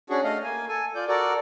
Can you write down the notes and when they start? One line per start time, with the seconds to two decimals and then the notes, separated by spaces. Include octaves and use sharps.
0.10 C#4 D4 F#4 G#4
0.24 A3 D#5 F5
0.44 A#3 G#5
0.69 A4 G#5
0.95 F4 D5 G6
1.08 F#4 A4 A#4 D5